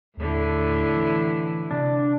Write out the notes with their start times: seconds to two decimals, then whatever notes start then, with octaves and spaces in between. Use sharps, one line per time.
0.17 D#2 A2 D3 E4
0.96 E3
1.71 C3 D4